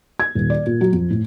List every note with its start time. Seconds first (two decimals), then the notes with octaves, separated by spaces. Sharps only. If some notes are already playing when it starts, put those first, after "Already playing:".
0.20 G#6
0.35 D#1
0.50 D5
0.66 A#2
0.81 F#3
0.93 F2
1.10 A2